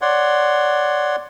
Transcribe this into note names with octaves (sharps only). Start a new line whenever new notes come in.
C#5 D5 F#5 C6